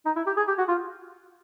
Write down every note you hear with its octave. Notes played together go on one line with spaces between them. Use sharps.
D#4
E4
G4
G#4
G4
F#4
F4